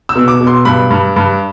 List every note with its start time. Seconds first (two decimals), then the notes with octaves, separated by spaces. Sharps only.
0.09 E6
0.15 B2
0.28 D6
0.41 B2
0.47 C6
0.65 G2 B5
0.90 G2
1.16 G2